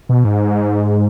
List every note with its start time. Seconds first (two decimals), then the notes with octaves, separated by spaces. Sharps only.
0.09 B2
0.25 G#2